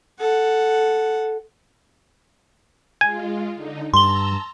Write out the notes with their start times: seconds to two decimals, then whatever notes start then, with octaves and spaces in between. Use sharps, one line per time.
0.20 A4 F#5
3.01 G#3 F4 G#5
3.55 D3 D#4
3.94 G2 A5 A#5 C6 E6 G7